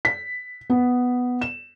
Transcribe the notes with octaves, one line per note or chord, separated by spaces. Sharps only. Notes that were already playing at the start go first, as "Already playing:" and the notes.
B6
B3
E7